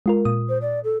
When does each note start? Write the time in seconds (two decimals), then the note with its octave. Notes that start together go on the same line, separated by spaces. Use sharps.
0.06 G#3 F4 A#4
0.25 A#2 D#6
0.49 C5
0.61 D5
0.84 A4